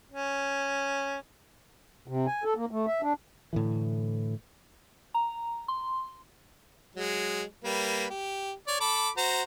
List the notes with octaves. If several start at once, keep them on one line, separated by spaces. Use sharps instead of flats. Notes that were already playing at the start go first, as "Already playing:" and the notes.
C#4
C3
G#5
A4
A#3
A3
E5
D4
A2 D3 E3
A#5
C6
F#3 G#3
G3 A#3 B4
G4
C#5 D5
A4 B5 D6
F#4 C5 A#5